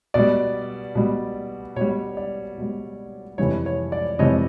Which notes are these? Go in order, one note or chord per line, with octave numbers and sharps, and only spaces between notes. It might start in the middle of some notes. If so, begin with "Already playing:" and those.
B2 G3 D5
B2 G3
B2 G3 C#5
D5
B2 G3
F2 C3 E3 G3 C#5
C#5
D5
F2 C3 E3 G3 C#5 D#5